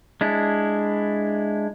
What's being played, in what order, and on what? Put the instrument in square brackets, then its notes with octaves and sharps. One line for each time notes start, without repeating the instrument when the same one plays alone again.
[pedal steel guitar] G#3 D4 E4